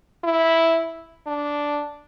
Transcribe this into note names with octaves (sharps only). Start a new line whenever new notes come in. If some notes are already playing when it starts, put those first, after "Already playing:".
E4
D4